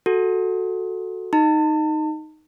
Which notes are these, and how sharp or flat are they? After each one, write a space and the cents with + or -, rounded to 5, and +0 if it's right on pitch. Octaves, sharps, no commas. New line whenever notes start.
F#4 +0 A4 +0
D#4 +0 A5 +35